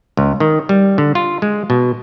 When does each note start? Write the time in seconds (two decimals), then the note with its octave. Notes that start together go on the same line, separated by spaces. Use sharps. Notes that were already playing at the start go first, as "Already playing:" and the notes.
0.17 C#2
0.40 D#3
0.69 G3
0.98 D3
1.15 F4
1.42 G#3
1.70 B2